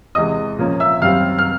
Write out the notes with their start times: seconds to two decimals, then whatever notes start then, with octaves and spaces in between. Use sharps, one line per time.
0.15 E2 C3 E3 G#3 D#5 D#6
0.59 A#2 F3 A#3 C#4
0.80 E5 E6
1.02 F#2 D#3 G3 C4 F5 F6
1.39 F6